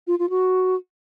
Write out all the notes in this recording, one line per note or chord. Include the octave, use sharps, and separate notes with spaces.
F4
F4
F#4